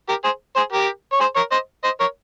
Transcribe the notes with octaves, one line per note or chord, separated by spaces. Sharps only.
G4 A#4
G#4 C5
G#4 C5
G4 A#4
C#5
G#4 C5
A#4 C#5
C5 D#5
C5 D#5
A#4 C#5